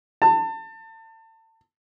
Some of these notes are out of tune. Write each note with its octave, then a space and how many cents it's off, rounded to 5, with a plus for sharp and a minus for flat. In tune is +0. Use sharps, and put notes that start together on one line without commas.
A5 +30